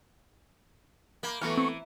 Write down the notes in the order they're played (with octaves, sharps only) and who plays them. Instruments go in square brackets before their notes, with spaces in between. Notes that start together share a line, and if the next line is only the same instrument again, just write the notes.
[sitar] A#3 [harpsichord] G5 B5
[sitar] E3 [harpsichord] A3 B3 F#4 [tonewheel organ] C#6 [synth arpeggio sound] F6 A#6
[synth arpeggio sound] C4